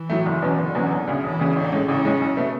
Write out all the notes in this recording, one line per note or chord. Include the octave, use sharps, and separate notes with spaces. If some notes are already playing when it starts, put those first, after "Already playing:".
Already playing: E3
A2 F#3 A3
F#1
E2 B2 F#3 C#4
F#1 D3
E2 B2 F#3 C#4
E1
D2 C#3
E1 E3
D2 C#3
A1 D3
A2 G#3 C#4
A1 C#3
A2 G#3 C#4
B1
B2 A3